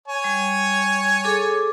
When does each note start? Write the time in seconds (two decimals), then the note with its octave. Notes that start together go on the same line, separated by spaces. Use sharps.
0.08 C#5 G#5
0.24 G3
1.24 G#4 A4 D6